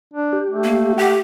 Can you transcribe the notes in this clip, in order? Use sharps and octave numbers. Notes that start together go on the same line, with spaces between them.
D4
G4
A3
A#3
G4 F#5 G5